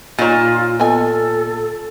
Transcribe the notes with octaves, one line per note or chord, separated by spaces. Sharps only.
A#2 D#4 F4 C#5
B3 A4 D#5 G#5